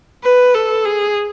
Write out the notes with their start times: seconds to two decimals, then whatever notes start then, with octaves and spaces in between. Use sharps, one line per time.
0.24 B4
0.54 A4
0.85 G#4